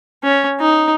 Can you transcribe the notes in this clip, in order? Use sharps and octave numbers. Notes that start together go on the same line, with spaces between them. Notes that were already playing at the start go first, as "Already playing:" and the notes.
C#4
D#4